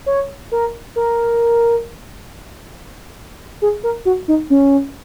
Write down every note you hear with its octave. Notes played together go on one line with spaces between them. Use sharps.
C#5
A#4
A#4
G#4
A#4
F#4
D#4
C#4